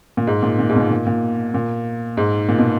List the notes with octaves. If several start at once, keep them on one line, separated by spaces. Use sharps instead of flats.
A#2
G#2
A#2
A#2
G#2
B2
A#2
A#2
A#2
A#2
G#2
A#2
B2